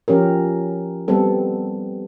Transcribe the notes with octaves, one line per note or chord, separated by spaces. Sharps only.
F3 C#4 G4 A#4
G3 B3 C4 A4